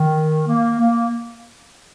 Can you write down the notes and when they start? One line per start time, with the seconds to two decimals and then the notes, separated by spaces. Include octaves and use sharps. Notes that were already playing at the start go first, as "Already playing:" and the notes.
Already playing: D#3
0.47 A#3
0.79 A#3